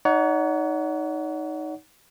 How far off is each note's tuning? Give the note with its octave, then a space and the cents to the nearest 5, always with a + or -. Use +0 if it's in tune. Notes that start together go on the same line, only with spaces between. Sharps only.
D#4 +0 C#5 +40 F#5 +0